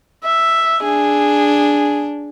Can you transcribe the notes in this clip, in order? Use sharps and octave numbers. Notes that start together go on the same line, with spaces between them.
E5
D4 G#4